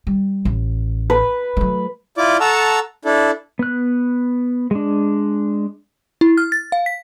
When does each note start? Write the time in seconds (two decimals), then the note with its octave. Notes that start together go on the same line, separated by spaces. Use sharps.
0.07 G3
0.45 A1
1.10 B4
1.57 F#3 A3
2.18 E4 F4 D5 D6
2.40 A4 F#5 A5 A#5 C#6 E6
3.05 D4 E4 A4
3.59 B3 F#6
4.71 G#3 D4
6.21 E4
6.38 F6
6.52 A6
6.72 F5
6.86 B6